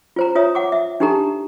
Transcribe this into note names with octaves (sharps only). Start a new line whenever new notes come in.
F4 C5 A#5
F4 C#5 E5 D#6
F#5 D6
E5
D4 D#4 G4 A4 A#5